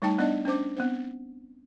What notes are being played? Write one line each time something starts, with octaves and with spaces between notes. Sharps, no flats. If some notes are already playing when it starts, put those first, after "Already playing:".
G3 A3 D#4 G5 A5
B3 D4 D5 D#5
C#4 D4 C5 D6
B3 C4 C5